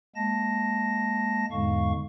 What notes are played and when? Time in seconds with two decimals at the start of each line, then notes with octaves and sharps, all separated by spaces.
0.16 G#3 A#3 A5 A#6
1.51 E2 G#2 D3 G#3 F5 C#6